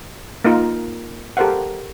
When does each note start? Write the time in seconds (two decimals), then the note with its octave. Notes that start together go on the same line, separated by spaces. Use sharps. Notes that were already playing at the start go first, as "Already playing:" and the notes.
0.44 A#3 D#4 F4 A#4
1.37 G4 A4 A#4 C5 F5 F#5